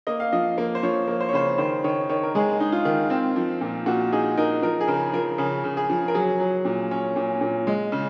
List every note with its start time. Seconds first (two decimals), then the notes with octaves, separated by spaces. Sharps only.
0.07 A#3 D#5
0.20 F5
0.32 F3 D#5
0.58 A#3
0.75 C5
0.83 F3 C#5
1.08 A#3
1.20 C5
1.29 C#5
1.33 C#3 C5
1.58 D#3 C5
1.84 D#3 C#5
2.09 D#3 C#5
2.23 A#4
2.35 G#3 G#4
2.60 D#4
2.72 F4
2.85 D#3
3.10 C4
3.36 F3
3.61 A#2
3.86 A#2 F#4
4.12 D#4 G#4
4.37 D#4 A#4
4.62 F3 A#4
4.80 G#4
4.88 C#3 A#4
5.13 F3 A#4
5.38 C#3 G#4
5.64 C#3
5.77 G#4
5.90 F3
6.08 A#4
6.14 F#3 G#4
6.40 F#3
6.65 A#2
6.91 C#4
7.16 A#2
7.41 A#2
7.67 G#3
7.92 C#3